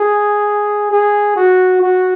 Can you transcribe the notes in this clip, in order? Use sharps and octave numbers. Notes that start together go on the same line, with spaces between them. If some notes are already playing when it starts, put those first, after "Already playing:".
Already playing: G#4
G#4
F#4
F#4